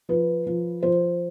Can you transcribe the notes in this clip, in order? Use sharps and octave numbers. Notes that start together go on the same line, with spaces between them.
F3 B4
F3
F3 C5